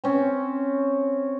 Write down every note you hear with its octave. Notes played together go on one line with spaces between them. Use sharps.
C4 C#4